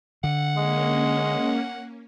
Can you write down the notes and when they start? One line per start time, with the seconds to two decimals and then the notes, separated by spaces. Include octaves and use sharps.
0.24 D3 F#5
0.57 G#3 A#3 C#4